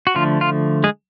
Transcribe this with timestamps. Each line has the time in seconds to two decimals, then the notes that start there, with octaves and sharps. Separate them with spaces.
0.07 F#4
0.15 D3 F3 A3 F4
0.41 F4
0.84 G#3 G#4